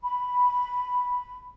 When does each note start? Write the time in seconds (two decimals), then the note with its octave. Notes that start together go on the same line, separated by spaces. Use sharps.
0.02 B5